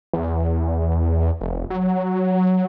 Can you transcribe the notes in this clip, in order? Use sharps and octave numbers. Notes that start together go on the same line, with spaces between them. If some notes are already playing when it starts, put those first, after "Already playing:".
E2
F1
F#3